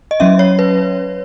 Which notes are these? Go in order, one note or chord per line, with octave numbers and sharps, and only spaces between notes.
D#5
F#3 C#4 E5
C#5
B4